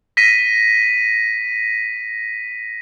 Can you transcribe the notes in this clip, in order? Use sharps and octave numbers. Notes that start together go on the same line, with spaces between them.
A#6 B6 D#7